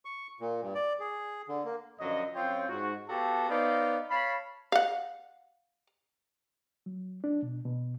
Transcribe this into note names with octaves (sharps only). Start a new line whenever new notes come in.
C#6
A#2
G2
D5
G#4
D3
A#3
F#2 D3 F3 F#3 D#5
F#2 C4 F4 C#5 G5
G#2 F#4
B3 F#4 G4 A4 F5 A5
B3 D#4 C5 D5 D#5 F5
C#5 F5 A5 B5
F5 F#5
F#3
D4
B2
B2